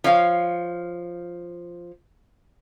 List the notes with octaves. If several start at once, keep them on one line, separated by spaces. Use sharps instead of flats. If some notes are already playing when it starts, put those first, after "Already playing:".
F3 C#5 F5